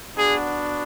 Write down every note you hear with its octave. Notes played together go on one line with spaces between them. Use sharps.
B3 D4 F#4 G#4